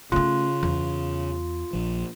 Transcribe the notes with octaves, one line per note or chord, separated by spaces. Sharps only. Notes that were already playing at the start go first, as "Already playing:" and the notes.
C#3 A3 C#4 F4
E2
A#1 F3